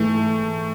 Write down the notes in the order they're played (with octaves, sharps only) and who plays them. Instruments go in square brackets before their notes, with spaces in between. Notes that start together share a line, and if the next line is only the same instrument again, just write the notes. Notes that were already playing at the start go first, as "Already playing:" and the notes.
Already playing: [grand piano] G#2 E3 G#3 [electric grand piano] A3